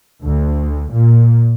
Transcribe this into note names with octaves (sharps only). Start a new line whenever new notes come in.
D2
A#2